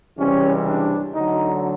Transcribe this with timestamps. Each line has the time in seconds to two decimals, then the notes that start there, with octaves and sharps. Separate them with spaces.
0.17 C#2 C3 E3 G3 C#4
0.66 D4
1.14 D2 D3 F#3 D#4